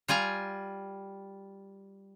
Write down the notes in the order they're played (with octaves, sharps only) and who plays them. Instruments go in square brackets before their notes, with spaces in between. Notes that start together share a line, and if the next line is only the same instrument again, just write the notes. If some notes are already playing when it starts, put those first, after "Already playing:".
[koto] G3 F4 G#5 A#5